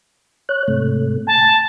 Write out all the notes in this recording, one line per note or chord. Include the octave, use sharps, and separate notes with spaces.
C#5 F#6
G#2 C3 A3
G#5 A5